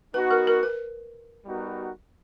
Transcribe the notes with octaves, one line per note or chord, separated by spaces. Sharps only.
B3 D#4 F#4 B4
A#4
A#4
B4
G3 B3 D#4 F#4 A#4